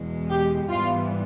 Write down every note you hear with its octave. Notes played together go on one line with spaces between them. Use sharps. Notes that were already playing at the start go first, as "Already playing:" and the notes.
Already playing: E2 B2 G#3
G4
G#2 E3 G3 B3 F4